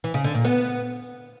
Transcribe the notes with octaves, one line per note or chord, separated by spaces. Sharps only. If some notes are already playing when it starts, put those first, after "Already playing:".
E3
C#3
D3
A#2
B3